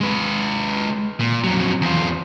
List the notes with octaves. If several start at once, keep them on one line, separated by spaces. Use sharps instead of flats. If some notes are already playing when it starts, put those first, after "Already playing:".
G#3 B4
A#2
F2 F#3
E2 F4